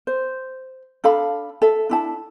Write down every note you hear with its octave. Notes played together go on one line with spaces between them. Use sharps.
C5
D4 A4 F5 B5
A4 E5
D4 E4 A5